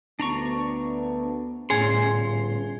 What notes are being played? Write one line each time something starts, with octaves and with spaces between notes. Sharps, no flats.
D2 B3 D4 A#5 C#6
G1 A2 C#4 G#4 G#5 C6 G#6